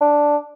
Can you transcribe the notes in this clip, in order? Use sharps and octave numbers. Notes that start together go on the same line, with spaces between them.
D4